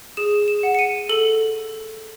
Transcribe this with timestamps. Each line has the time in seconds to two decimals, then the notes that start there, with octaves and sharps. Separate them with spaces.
0.17 G#4 E7
0.48 E7
0.63 F#5
0.75 C#7
0.79 D#7
1.09 A4 F#7